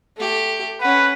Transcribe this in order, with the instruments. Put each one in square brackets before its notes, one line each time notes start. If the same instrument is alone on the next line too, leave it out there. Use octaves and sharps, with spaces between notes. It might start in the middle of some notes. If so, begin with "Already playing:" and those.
[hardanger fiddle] A3 G4
[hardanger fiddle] C#4 F#5 [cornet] B4